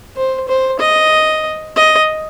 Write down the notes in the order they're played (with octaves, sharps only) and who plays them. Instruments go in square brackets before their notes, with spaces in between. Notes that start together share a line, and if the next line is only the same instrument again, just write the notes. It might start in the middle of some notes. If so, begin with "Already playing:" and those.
[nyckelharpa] C5
C5
D#5
D#5